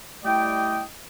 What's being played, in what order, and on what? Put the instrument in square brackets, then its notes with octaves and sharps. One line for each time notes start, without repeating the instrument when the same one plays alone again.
[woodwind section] G3 A3 E4 D5 D#5 G5